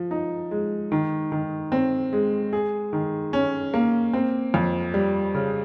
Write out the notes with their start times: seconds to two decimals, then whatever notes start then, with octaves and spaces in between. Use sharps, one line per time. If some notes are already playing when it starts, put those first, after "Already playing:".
Already playing: F3
0.11 D#4
0.51 G#3
0.92 D#3
1.32 D#3
1.72 C4
2.13 G#3
2.53 G#4
2.93 D#3
3.33 C#4
3.74 A#3
4.13 C4
4.54 F2
4.94 G3
5.35 C#3